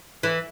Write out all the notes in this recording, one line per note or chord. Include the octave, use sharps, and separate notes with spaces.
E3